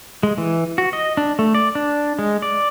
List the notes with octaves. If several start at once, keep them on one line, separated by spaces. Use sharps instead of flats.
G#3
E3
F#4
D#5
D4
A3
D5
D4
G#3
D5